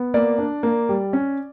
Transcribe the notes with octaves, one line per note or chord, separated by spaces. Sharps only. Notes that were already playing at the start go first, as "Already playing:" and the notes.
Already playing: B3
A#3 D5
D4
A#3
G3
C#4